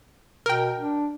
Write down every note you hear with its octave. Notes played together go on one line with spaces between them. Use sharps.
B2 A#4 G5
D4